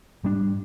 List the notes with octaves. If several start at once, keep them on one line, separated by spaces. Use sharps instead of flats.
G#2 G3 D4